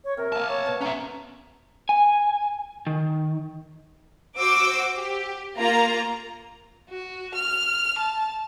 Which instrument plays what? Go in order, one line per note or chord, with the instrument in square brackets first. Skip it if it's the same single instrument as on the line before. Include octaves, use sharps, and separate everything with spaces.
[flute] C#5
[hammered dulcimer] C3 [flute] A#4
[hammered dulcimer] A3 A#3 [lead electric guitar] G#5 A5
[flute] C#5
[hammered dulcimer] B2
[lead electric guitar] C#4 E5 [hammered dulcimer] F#5 [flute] A#5
[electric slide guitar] G#5
D#3
[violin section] F#4 C5 D6 E6
G4
A#3 F4 A#5
[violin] F#4
F6
A5